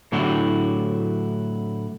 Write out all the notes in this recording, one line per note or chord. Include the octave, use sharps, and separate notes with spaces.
A2 D3 F#3 E4 F#4 G4